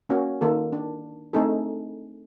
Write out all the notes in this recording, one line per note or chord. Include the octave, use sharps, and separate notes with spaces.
A#3 C#4 F#4
D#3 A#3 A4
D4
A3 C4 D4 D#4 G#4 A4